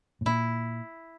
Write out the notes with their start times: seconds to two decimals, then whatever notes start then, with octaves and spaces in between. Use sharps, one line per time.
0.21 A2
0.26 A#2 E4